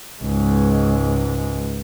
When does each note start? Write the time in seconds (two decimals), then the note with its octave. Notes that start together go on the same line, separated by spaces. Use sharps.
0.21 C#2 G#2